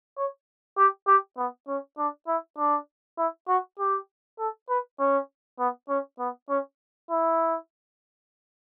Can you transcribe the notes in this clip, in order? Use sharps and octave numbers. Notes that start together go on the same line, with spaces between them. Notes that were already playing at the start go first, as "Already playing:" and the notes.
C#5
G4
G4
B3
C#4
D4
E4
D4
E4
F#4
G4
A4
B4
C#4
B3
C#4
B3
C#4
E4